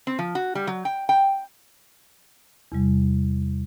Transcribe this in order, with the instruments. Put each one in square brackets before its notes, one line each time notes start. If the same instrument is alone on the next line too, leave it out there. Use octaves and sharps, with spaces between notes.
[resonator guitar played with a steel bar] C4
F3
F#4
G3
F#3
G5
G5
[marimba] E2 C3 G3